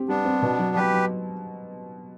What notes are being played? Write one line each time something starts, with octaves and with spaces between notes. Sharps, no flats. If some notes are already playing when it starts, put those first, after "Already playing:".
Already playing: C4 G4
G3 B3 D4
C4
B2
F#3
F#3 G4 B4
F#3